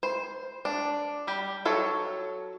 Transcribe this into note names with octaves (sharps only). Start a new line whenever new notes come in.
C5
D4
G3 G4
F#3 A4 C#5